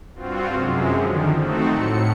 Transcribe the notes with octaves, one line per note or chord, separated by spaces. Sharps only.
G2 C4 F4 F#4
F#2 C3 G#3
D3 D#3 F3
A3 C4 D#4 F#4 A4
A2 C#7